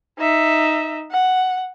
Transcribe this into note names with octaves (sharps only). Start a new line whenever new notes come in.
D#4 E5
F#5